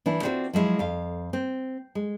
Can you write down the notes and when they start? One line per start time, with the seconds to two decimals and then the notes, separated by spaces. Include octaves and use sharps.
0.06 E3 D4 E4
0.23 C4 D4 F4 F#4 B4 C5
0.53 F3 F#3 G#3 E4
0.79 F2 F5
1.33 C4
1.95 G#3